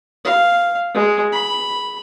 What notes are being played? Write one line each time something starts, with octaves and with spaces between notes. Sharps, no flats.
F5
G#3
B5